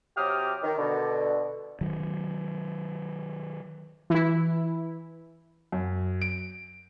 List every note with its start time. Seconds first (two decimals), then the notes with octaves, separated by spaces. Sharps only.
0.17 C3 F#3 G4 D6 D#6 F6
0.63 D#3
0.78 B2 D3
1.81 D#3 F#3
4.10 E3 E4
5.72 F#2
6.22 D7